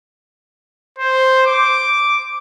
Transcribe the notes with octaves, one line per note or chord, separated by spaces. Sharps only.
C5
D6